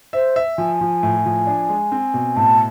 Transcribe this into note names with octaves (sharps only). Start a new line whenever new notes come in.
C5 E5
E5
F3 G#5
F3
A2
F3
D4
G#3
C4
B2
A2 A5